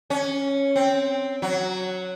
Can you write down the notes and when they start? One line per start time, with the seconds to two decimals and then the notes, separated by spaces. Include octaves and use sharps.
0.10 C#4
0.76 C4
1.42 F#3